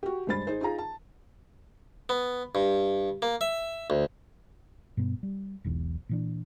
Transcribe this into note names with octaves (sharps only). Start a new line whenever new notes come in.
F#4 G4
G2 G#3 C5 B5 A6
D#4 G#4 C5
D#4 F4 G#4 A#5
A5
B3
G2
A#3
E5
D2
G2 B2 B3
G3
E1 B1 E2
A#2 E3 D4